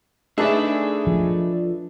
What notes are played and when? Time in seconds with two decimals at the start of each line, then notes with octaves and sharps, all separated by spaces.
0.38 A3 D4 D#4 G#4 A4 B4 D5 E5
1.07 F3